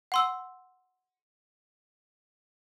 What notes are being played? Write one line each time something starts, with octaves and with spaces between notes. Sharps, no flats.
F#5 C6 E6